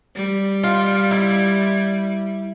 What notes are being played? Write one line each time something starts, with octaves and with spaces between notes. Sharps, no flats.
G3
F4
E4